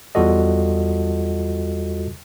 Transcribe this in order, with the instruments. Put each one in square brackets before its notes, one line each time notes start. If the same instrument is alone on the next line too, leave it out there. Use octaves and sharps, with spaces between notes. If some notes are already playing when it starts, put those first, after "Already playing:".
[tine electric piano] E2 G3 F4 F#4 A4 D#5